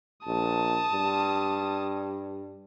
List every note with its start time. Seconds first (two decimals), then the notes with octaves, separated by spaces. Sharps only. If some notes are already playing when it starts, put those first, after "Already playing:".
0.26 A#1 A5 D#6
0.93 G2